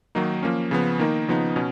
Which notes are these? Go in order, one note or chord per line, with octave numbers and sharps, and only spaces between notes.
D#3 F#3 A#3 D#4
F3 A#3 C#4
C#3 F3 B3
D#3 A#3 D#4
C#3 F3 B3 D#4
B2 C#4